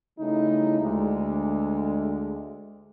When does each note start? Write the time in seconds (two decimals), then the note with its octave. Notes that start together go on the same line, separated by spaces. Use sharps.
0.19 C#3 G3 A3 D#4 E4
0.81 D2 D3 G#3